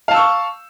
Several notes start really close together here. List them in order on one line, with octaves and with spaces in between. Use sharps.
F5 A5 E6 C#6